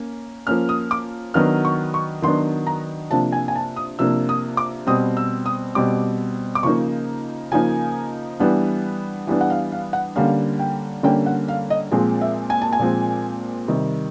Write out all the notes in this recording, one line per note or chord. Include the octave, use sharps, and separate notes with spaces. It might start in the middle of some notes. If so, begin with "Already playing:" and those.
Already playing: A#3 C#4
F3 A#3 C#4 F6
D#6
D6
D#3 F#3 B3 D4 F6
C#6
C#6
D#3 F#3 B3 D4 C6
A#5
C3 F3 A#3 D4 A5
G#5
G#5
A5
D#6
C3 F3 A#3 D4 E6
D#6
D6
B2 G3 C4 D#6
E6
D#6
B2 G3 C4 D6
D6
C#3 F3 A#3 D#4 C#6
C#3 F3 A#3 D#4 G#5
E3 G3 B3 D4
E3 G3 B3 D4
F#5
F5
F5
F#5
D3 G3 A#3 C#4 F5
G5
D3 G3 A#3 C#4 G5
F#5
F5
D#5
A#2 F3 G#3 C4
E5
G#5
A5
G#5
A#2 F3 G#3 C4
C3 D#3 G3